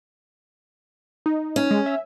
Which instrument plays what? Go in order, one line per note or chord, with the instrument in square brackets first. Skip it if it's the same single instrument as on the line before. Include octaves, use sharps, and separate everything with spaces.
[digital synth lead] D#4
[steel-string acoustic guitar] C#4
[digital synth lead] G#3
E5